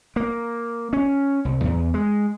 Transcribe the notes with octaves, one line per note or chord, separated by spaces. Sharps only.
A#3
C#4
C2
E2
G#3